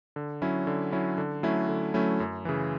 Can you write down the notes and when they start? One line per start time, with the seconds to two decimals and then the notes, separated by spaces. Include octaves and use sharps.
0.16 D3
0.42 F#3 C#4 E4
0.67 D3
0.92 F#3 C#4 E4
1.18 D3
1.43 F#3 A3 C#4 E4
1.69 D3
1.94 F#3 A3 C#4 E4
2.20 F#2
2.45 C#3 E3